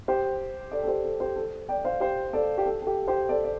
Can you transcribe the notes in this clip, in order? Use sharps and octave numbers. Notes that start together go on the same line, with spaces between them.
G4 C5
A4 D5
A4
G4 C5
A4
G4 C5
A4
D5 G5
C5 F5
G4 C5
A4 D5
G4
A4
A4
G4
G4 C5
A4 D5
D5